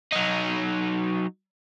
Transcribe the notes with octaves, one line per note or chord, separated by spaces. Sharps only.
F#3 D#4